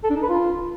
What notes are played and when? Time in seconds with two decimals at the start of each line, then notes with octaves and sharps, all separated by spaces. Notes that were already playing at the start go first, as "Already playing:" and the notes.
0.04 A4
0.10 D4
0.16 D#4
0.23 B4
0.29 F4